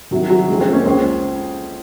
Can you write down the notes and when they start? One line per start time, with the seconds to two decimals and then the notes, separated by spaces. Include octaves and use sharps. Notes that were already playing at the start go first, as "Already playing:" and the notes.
0.11 C2 C3 D#3 F#3
0.30 F#3
0.48 F2 C#3 G#3
0.61 G#3 C4
0.73 A#3 C#4
0.86 C#2 C#3 G#4 C5